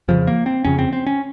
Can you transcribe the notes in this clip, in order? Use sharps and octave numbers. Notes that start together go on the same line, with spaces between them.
F2 C#3 F3
A#3
C4
F2 C#3 C#4
C4
C4
C#4